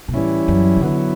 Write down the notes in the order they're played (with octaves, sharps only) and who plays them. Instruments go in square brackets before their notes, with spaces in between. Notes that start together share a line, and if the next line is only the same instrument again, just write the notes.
[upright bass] B2
[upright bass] A2 [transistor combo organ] E3 G3 C#4 E4
[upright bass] F#2
C#3
[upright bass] D3 [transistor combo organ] F#3 B3 E4